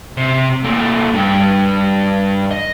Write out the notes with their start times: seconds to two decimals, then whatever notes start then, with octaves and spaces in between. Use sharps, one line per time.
0.17 C3
0.63 A#2 A3
1.14 G2 D4
2.51 D#5